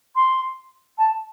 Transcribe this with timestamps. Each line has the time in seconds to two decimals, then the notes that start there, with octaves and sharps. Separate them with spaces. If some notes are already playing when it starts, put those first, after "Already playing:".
0.16 C6
0.98 A5